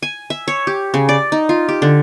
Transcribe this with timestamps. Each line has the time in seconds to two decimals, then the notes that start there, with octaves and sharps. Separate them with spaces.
0.02 G#5
0.30 E5
0.48 C#5
0.67 G4
0.94 C#3
1.09 D5
1.32 D#4
1.49 F4
1.69 G4
1.82 D3